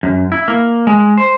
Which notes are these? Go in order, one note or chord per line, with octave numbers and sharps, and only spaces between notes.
F#2
E4
A#3
G#3
C5